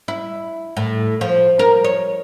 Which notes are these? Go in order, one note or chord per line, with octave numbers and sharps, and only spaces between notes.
E4
A2
F3
A#4
C#5